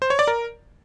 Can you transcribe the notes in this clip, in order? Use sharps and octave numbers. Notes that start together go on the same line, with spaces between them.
C5
C#5
D5
A#4